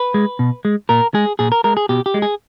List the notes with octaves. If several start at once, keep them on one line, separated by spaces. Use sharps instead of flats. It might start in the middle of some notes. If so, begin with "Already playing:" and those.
Already playing: B4
G#3
B2
G#3
A#2 A#4
G#3 G#4
A#2 G#4
A#4
G#3 A#4
G#4
B2 G4
G4
G#3
G#4